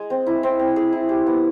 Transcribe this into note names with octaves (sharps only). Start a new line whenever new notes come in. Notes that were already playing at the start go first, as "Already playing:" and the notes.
Already playing: G#3
C4
E4
C4
C4
G#4
E4
G4
B3